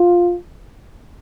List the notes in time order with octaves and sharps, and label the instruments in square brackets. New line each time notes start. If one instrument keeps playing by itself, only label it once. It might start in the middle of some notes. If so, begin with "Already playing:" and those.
Already playing: [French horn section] F4